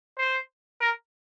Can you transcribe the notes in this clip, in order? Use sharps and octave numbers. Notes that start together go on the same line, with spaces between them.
C5
A#4